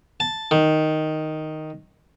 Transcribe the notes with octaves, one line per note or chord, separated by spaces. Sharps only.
A5
D#3